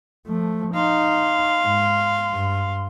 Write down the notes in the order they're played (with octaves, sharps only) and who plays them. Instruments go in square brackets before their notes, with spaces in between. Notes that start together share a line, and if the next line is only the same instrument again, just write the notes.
[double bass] F3 A3
[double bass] D#4 [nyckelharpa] F5 [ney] C6
[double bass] G#2
G2